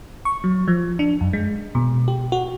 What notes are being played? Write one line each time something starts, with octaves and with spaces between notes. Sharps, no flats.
C#6
F#3
F3
D4
F#2
G#3
B2
G4
F#4